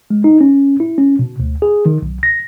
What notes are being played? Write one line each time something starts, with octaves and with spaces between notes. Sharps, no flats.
G#3
D#4
C#4
E4
C#4
B2
D2
G#4
D#3
B1
A#6